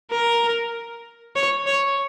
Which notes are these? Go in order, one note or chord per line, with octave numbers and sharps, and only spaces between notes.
A#4
C#5
C#5